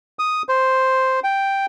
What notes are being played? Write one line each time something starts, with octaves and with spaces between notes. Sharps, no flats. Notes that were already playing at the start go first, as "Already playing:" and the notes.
D#6
C5
G5